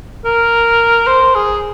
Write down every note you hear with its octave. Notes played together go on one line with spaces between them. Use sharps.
A#4
C5
G#4